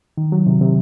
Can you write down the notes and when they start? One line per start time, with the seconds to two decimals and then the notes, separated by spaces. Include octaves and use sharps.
0.17 D#3
0.32 F#3
0.47 C3
0.61 C3